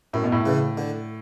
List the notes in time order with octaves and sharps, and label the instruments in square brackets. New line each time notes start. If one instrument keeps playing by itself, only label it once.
[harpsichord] F#2 [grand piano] A2
[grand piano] B2
A2
[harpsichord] C#3 E3
D3